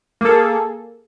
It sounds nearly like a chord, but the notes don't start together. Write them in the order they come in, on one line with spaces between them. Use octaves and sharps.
A#3 A4 G#4